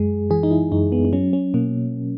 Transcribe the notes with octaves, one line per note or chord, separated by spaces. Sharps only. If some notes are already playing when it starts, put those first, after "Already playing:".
Already playing: F#2 G#3 G#4
E3 G#4
D#4
E4
F#2 D#4
B3
B3
F#3 C#4
C#4
B2 A#3